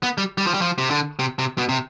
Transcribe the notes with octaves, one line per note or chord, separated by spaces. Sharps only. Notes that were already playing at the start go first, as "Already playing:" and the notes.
B3
G3
G3
F3
G3
F3
C3
D3
C3
C3
B2
C3